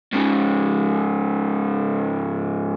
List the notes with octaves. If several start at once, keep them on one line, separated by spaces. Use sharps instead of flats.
G#2 C#3